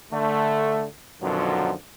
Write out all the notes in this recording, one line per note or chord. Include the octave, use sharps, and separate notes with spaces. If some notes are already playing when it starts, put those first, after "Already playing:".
D3 A3
F#2 B2 D3 D#3 F3 F#3